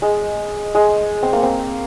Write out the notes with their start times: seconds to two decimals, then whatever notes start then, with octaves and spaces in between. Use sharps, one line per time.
0.02 G#3
0.75 G#3
1.23 C4
1.33 A#3
1.43 C4